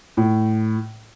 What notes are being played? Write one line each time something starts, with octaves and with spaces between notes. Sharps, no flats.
A2